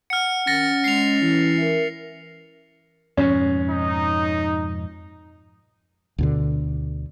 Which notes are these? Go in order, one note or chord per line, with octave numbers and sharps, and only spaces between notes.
F#5 F6 C#7
D#3 C#4 A6 A#6 C#7
G#3 C7 F7
E3 E4
A#4 E5
F2 G#2 B2 C#4
D#4
D2 B2 D3